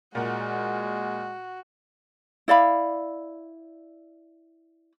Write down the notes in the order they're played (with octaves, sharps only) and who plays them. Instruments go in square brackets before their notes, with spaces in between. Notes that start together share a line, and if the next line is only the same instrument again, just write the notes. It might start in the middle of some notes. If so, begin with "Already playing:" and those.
[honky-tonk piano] A#2 F#5 [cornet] G#3 [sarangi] F#4
[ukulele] E4 D5 F5 B5